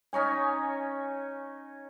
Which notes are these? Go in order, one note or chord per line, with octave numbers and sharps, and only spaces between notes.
C#4 D#4 C#5 G#5